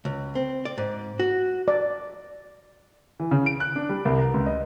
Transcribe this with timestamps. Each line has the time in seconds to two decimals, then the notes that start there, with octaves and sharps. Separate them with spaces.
0.05 C#2
0.35 C4
0.65 D5
0.78 G#2
1.19 F#4
1.68 D5
3.20 E3
3.31 C#3
3.46 D7
3.60 F#6
3.76 D4
3.89 G3
4.05 C2
4.18 A#5
4.34 C#2
4.46 D#5